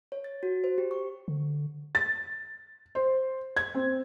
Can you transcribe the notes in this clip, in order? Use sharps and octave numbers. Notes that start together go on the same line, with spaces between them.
C#5
A6
F#4
C5
G4
C#6
D3
A6
C5
G#6
C4